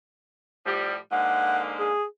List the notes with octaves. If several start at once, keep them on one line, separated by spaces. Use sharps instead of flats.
A2 F3 G3
G#2 D3 A#3 F#5
G#4